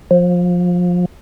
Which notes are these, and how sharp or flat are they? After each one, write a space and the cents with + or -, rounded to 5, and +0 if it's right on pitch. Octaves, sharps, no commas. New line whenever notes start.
F3 +25